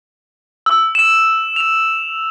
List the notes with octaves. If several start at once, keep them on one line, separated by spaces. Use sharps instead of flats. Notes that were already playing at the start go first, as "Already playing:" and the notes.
E6
E7
F7